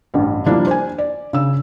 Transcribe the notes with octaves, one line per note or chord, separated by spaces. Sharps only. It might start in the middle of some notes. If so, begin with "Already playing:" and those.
A1 G2
F3 G3 A#3 D4 E4
C5 G#5
D5
C#3 E6